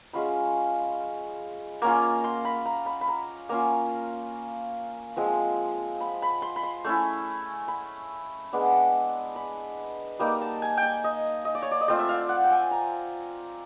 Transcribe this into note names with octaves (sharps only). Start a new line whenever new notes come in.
G#3 C#4 F4 B5
A#3 C#4 F4 A#5
C6
B5
A#5
B5
B5
A#5
A#3 C#4 F4 A#5
F3 G#3 C4
B5
B5
C6
B5
C6
A3 C#4 E4
B5
G#3 B3 D4
B5
G3 A#3 D#4 A#5
A5
G#5
G5
G#5
D#5
D#5
D5
C#5
D5
D#5
A3 C4 F4 D5
E5
F5
F#5
G5
G#5
A#5